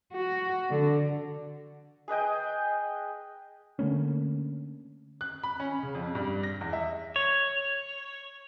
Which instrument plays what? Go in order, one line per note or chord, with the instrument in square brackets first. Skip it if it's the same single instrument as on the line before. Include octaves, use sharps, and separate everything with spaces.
[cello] F#4
D3
[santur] G#4 B4 D#5 G5
[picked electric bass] D3 A3 A#3 C#4
[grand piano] F#6
B5
C#4
C#3
F2
G2
A#6
E2
E5
[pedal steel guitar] C#5